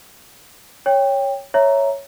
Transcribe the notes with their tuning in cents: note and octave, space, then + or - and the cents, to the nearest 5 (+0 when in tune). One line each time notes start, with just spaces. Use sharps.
C#5 +0 G5 +15
C#5 +0 E5 +0 A#5 +0